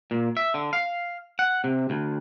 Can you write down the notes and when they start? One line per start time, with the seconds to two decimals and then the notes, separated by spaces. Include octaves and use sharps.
0.11 A#2
0.37 E5
0.54 D3
0.73 F5
1.39 F#5
1.64 C3
1.90 D2